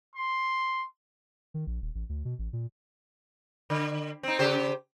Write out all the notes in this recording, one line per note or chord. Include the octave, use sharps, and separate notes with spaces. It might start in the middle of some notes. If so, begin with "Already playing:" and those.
C6
D#3
A#1
D#1
A1
D2
B2
A1
A#2
D3
C4 D#4
C#3 G4 C5